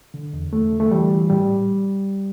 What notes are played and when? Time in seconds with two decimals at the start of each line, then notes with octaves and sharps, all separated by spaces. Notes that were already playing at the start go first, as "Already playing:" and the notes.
0.14 D3
0.33 E2
0.52 E2 A3
0.72 D3
0.80 A3
0.91 E3 G3
1.11 E3
1.30 A2 G3